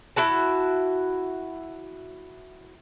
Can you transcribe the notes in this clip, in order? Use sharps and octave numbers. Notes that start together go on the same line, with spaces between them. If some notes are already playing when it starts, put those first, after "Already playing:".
E4 F#4 A5